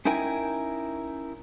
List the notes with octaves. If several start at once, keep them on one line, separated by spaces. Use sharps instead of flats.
C#4 D#4 E4 A#4 G5 G#5